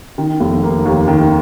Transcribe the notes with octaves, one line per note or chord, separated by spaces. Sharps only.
D#3
F1
A#3
D#2
D#3